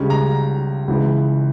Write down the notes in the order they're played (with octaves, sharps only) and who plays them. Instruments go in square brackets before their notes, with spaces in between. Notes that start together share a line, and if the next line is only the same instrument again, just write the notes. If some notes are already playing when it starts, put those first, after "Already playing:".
Already playing: [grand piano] C#2 C#3 G3 C#4
A#5
C#2 C#3 E3